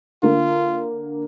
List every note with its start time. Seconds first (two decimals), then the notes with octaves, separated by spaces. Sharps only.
0.23 D3 A#3 F4